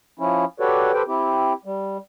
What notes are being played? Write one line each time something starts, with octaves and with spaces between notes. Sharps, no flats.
F3 C#4 E4
F#4 G4 A4 B4 C#5 D5
G4 A4 B4 C5 G5
C4 E4 G4
G3